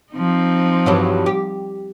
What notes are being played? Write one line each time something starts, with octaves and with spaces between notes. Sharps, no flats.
F3 C4 D#4
G2 E3 F#3
G4